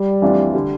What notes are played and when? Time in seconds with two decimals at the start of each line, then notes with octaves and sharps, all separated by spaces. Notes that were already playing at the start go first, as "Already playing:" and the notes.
Already playing: G3
0.22 F2 E3 A3 D4 F4
0.54 D3 G3